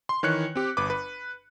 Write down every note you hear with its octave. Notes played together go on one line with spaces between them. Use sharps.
C6
D#3 E3 C#5 F#6 C#7
C4 G4
G1 B4 D6
B4